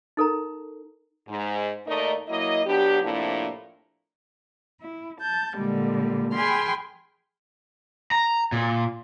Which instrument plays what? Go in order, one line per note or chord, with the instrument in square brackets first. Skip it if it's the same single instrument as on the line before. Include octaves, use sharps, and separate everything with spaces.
[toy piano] D#4 A4 A#4 A#5
[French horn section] G#2
D#2 A3 D#4 A#4 D5 D#5
F#3 A#3 E4 D#5
F#3 B3 D4 G4
A2 C3 F3 A#3 D4 E4
[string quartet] E4
A5 G6
A#2 D3 G3 G#3
G#4 G5 G#5 B5 C6 F6
[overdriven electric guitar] A#5
A#2